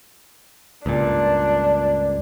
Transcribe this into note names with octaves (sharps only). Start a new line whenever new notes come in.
C#2 G2 A#2 D4